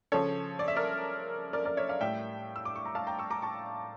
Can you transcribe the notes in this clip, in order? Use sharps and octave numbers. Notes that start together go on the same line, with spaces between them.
C#3 F3 A4 C#5
D5
E5
A#4 D5
A#4 D5
A#4 D5
C#5 E5
D5 F5
A2 G3 E5 G5
E6
D6
C#6
A#5
F5 A5
G5 A#5
C#6 E6
A#5 D6
A5 C#6